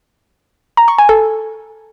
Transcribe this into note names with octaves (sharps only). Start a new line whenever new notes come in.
A#5
C#6
G#5
A4